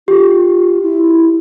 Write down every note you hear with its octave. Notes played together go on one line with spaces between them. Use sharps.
F4 G4
E4